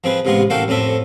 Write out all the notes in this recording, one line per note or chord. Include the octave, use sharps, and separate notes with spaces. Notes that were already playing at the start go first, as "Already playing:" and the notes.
F3 C4 G#4 B4
A1 C3 G#3 B3 F4 G#4
A1 A#3 F#4 A4 F5 G5
F2 A2 C4 A4 E5